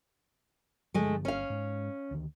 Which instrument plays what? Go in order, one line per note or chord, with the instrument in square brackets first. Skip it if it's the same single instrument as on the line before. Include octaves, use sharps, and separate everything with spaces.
[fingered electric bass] G2 D3 F3 [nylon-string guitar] G#3 A3
[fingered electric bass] G1 [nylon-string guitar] C#4 F5
[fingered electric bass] G#2 G#3
D2 D#3